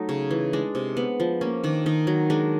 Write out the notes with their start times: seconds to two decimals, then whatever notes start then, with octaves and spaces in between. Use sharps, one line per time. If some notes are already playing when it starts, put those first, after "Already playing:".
Already playing: F#3 A3 D#4
0.09 C#3
0.31 E3
0.53 G#3 D4
0.75 C3
0.97 B3
1.20 F3
1.41 A#3 C#4
1.64 D#3 D4
1.86 D#3 D#4
2.07 F#3
2.30 G#3 D4